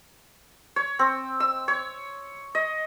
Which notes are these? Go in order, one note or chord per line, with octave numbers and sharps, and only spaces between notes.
C#5
C4
E6
C#5
D#5